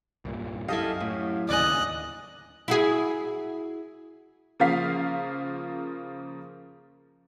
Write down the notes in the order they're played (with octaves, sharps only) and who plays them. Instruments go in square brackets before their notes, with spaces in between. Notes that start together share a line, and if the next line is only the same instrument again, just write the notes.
[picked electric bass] C2 G2 A#2
[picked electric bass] F#2 [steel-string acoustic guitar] E4 A4 D#5 [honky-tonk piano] G4 F5 D#6
[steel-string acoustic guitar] A2
[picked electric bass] D1 D#2 C#3 [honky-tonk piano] D5 G#5 [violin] D#5 F#6
[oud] E4 F#4 G#4
[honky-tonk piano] C#3 F3 A#3 F5 B6